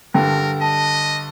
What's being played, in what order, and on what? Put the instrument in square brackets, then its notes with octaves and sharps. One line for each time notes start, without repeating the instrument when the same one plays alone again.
[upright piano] G2 D3 [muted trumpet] A#4 [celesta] G5
[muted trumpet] D#5 [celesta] A5